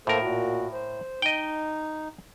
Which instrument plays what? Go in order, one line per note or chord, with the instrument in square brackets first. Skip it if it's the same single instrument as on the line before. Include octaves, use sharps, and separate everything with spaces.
[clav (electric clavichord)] A2 A#4 [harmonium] A#3 A4 C5
[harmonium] A#2 F#4
C5
[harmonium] D#4 [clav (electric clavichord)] D#5 G5